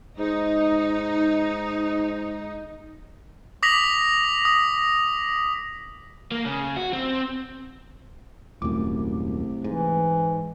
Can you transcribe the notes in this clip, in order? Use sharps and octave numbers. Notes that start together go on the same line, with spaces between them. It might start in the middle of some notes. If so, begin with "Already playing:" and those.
G#2 D#4
D6 D#6 A#6 B6 F7 F#7
D#6
A#3
C#3
F#4
C4
D#1 C2 F#2 A3 D6
G#2 E3